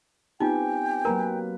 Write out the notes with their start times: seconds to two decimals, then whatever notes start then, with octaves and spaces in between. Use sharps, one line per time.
0.40 B3 C4 D#4 F4 G4 G5 G#5
1.05 F#3 A#3 A#4 B4 A#5